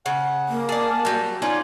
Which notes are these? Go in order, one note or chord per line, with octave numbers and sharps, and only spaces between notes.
C#3 F#5
A#3
G#4 D5 A5
F#3 G3
C#4 D#4 F4 D5